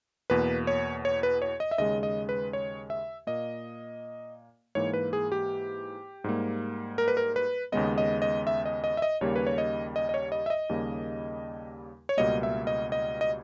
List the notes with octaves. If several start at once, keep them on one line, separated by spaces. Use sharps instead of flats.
E2 B2 A#3 B4
C#5
C#5
B4
C#5
D#5
E5
D#2 C#3 G#3 D#5
D#5
B4
C#5
E5
A#2 A#3 D#5
G#2 E3 A#3 C#5
B4
G#4
G4
G#2 G3 A#3
A#4
B4
A#4
B4
D#2 C#3 G#3 B3 D#5
D#5
D#5
E5
D#5
D#5
E5
D#5
D#2 C#3 G3 A#3 C#5
B4
C#5
D#5
D#5
D#5
C#5
D#5
E5
D#5
D#2 C#3 G3 A#3
C#5
C#2 B2 G3 A#3 D#5
E5
D#5
D#5
D#5